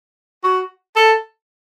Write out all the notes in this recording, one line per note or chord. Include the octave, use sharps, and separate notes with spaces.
F#4
A4